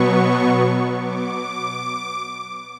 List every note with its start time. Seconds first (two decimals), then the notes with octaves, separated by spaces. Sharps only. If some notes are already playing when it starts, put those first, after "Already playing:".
Already playing: B2 F#3 B3 C#6
0.97 D6